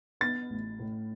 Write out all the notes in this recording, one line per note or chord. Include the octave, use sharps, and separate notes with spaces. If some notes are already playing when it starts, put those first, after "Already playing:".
B3 A6
A1
A2